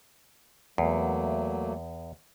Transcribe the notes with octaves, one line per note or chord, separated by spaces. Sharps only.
E2 F#3 A3 A#3